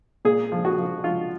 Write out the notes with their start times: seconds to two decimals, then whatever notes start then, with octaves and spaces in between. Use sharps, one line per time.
0.25 A#2 G#4
0.52 F3
0.65 F#4
0.78 F3
1.04 F3 F4